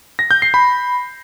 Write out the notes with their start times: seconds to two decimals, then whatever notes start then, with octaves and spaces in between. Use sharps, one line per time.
0.19 A#6
0.31 G6
0.42 C7
0.54 B5